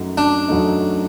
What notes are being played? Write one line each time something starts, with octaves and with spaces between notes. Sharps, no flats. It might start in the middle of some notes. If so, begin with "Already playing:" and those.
Already playing: F#2 F#3 A3 D#4
D4
F#2 F#3 A3 D#4